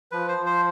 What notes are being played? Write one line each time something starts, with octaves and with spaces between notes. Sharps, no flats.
F3 B4
C5
F3
C5